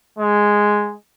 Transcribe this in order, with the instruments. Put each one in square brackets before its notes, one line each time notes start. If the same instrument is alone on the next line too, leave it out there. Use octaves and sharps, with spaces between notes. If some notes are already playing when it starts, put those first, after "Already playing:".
[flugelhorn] G#3